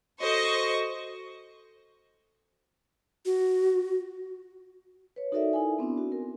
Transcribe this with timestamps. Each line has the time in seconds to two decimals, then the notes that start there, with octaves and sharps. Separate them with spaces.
0.21 F#4 A4 C5 D#5 C#6
3.26 F#4
5.16 B4 C#5
5.32 D#4 F#4 A4 A#4 D5 E5
5.53 D#4 E4 A4 G#5
5.79 B3 C4 D4 E4
5.98 F#4
6.12 A#4